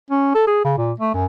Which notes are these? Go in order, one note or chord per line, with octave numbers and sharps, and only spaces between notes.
C#4
A4
G#4
C#3
A#2
A3
F#2